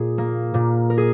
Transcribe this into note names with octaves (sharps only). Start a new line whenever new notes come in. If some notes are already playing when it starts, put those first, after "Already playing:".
Already playing: A#2 G#4
A#3
A#2
A#4
G#4